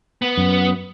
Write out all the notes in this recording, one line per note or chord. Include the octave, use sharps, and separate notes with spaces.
B3
F#2